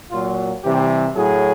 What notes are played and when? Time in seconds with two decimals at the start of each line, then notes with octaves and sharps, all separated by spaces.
0.11 A#2 F#3 F4
0.64 C3 E3 G3 G4
1.16 A2 F#3 G#4